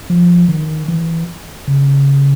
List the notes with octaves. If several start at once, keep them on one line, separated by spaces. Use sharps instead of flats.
F3
D#3
E3
C#3